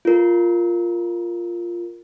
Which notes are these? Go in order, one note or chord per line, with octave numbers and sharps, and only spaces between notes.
F4 A#4